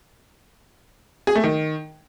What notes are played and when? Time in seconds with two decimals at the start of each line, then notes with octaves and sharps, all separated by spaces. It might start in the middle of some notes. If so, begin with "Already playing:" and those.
1.27 G#4
1.35 A3
1.44 D#3